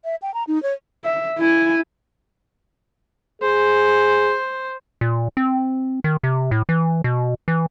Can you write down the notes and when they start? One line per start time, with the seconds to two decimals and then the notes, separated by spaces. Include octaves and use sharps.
0.04 E5
0.22 G5
0.34 A#5
0.47 D#4
0.63 C#5
1.04 E5
1.38 E4 G#5
3.42 G#4 C5
5.01 A#2
5.37 C4
6.04 D#3
6.23 C3
6.51 A2
6.69 E3
7.04 B2
7.48 E3